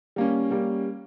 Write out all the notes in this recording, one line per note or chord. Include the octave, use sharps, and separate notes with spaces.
G3 A#3 C#4
G3 A#3 C#4